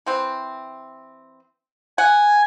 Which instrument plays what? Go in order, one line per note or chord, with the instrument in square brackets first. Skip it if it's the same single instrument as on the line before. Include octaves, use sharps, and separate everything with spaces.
[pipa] E3 C4
[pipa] F#5 [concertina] G#5